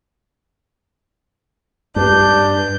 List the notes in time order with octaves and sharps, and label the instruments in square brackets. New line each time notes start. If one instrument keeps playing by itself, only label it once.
[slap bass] G2 [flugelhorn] D4 [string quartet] G6